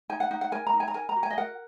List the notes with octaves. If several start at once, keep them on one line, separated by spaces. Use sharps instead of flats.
D#4 G#5
F#5
D#4 F#5
F#5
A#4 G#5
A#5
D#4
G#5
A#5
A#4 G#5
A#5
F#4
G#5
D#5
A#4 F#5